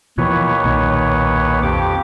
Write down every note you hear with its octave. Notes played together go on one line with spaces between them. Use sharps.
D#2 B2 E3 F3 B4 C#5
B1 A#2 D#3
F2 G4 D6